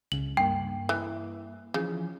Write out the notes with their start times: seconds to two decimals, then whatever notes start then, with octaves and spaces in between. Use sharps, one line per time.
0.12 C#2 C#3 F#7
0.37 G2 A#3 G5
0.89 E3
1.74 C#3 E3 F3 G#4